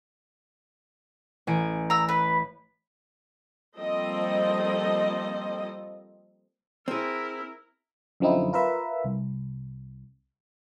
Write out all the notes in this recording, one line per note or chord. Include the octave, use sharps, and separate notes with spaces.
A1 G#5 D7
A#5 E6
B4
F3 G3 A#3 C4 A4 D#5
C4 E4 G#4 A#4
F#2 D3 F3 C4 D#4 E4
F4 A#4 B4 E5
C2